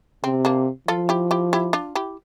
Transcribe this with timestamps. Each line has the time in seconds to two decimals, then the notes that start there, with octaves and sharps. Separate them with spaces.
0.24 C3 C4
0.45 A#3 D4
0.88 F3 F4 A4
1.09 E4 G4
1.31 E4 G4
1.53 E4 G4
1.73 D4 F4
1.95 E4 G4